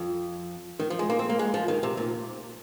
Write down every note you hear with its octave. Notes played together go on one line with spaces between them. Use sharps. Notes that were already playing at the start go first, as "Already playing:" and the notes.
Already playing: F2
D#3
F3
G#3
A#3
C4
A#3
G#3
F3
D#3
C3
A#2